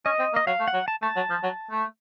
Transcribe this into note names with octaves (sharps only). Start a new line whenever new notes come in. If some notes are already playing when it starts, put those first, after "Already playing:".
C#4 D#5
C4
A#3
D#5
F#3 F5
A3
F#5
F#3
A5
A3 A5
F#3
F3
F#3
A3